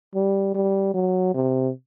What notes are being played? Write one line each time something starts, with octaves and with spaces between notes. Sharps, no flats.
G3
G3
F#3
C3